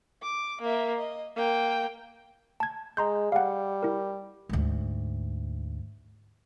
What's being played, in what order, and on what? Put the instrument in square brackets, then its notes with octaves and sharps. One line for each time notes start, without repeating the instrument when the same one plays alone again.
[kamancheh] D6
A#3 E5
D#5
A#3 G5
[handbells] A5 G#6
[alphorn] G#3 [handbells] A#5 C6 G6
[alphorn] G3 [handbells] F5 F#5
[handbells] E4 A#4
[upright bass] D2 G#2